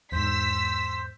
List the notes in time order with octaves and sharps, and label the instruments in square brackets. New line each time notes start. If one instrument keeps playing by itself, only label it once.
[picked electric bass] E2 G#2 [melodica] C5 [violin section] E6 B6